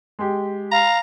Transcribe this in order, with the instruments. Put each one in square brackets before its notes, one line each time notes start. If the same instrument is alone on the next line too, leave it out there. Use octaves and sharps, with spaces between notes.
[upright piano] G#3 G4
[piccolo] F5 [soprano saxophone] A#5